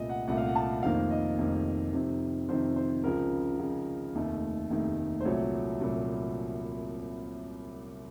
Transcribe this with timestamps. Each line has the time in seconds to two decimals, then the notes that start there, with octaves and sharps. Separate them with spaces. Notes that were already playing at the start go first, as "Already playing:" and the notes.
Already playing: C2 A#2 A3 D#5
0.09 F#5
0.28 C2 A#2 A3 F#5
0.38 F5
0.46 F#5
0.56 A5
0.83 F1 F2 D#3 A#3 F5
1.11 D#5
1.38 F1 F2 D#3 A#3
1.93 F2 C3 D#3
2.49 F2 C3 D#3 C5
2.76 C5
3.04 C#2 C#3 F3 A#4
3.59 C#2 C#3 F3
4.15 F1 D#2 D#3 A3
4.70 F1 D#2 D#3 A3
5.20 C5
5.25 C2 A#2 F#3 A3 C#5
5.80 C2 A#2 F#3 A3